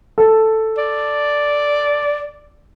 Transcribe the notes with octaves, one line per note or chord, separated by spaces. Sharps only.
A4
D5